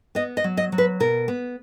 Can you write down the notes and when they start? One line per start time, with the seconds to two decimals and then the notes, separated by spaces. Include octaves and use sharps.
0.15 B3 D#5
0.37 D#5
0.44 F#3
0.57 D#5
0.72 F#3
0.78 B4
1.00 B2 A#4
1.28 B3